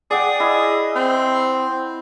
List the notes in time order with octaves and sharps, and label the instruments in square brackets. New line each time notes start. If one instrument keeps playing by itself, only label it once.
[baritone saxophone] G#4 [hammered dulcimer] D5 F#5 G5
[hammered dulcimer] E4 D#5
[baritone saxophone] C4